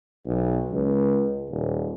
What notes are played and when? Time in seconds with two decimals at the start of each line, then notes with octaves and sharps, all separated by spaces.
0.26 B1
0.72 C#2
1.50 D#1